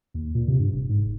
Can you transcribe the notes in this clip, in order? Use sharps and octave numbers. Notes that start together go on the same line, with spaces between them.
D#2
A#2
C3
G2
F1
G#2
F#1